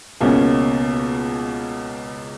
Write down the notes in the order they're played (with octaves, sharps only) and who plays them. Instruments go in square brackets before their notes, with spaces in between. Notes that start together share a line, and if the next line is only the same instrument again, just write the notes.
[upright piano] C#2 B2 A#3 C#4